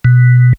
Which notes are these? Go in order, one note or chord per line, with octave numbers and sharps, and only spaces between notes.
B2